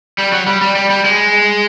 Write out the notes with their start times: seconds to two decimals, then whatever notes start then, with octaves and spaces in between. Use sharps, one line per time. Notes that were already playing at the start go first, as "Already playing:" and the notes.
0.18 G3
0.32 F#3
0.47 G3
0.61 G3
0.75 G3
0.90 G3
1.04 G#3